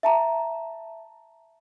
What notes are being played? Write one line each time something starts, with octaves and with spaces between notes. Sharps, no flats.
E5 A5 A#5